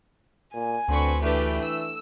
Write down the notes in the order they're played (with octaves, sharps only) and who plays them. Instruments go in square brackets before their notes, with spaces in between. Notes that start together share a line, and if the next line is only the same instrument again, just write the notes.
[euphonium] A#2 [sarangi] G#5
[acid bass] D2 [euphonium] D3 [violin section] C4 B4 C#6
[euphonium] E3 [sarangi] A3 [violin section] D4 G4 B4
[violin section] E6